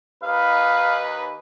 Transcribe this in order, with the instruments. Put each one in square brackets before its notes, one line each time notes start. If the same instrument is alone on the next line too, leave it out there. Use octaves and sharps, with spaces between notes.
[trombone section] D#2 D#4 B4 [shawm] F5